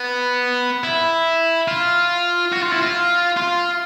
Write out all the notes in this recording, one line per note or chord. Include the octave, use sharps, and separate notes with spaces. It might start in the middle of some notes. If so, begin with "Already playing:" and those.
Already playing: B3
E4
F4
F#4
F4
E4
F4
F4